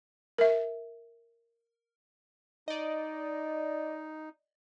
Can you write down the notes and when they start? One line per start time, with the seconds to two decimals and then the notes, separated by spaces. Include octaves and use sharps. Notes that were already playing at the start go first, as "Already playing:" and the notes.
0.38 A#4 E5
2.68 D#4 D5 D#5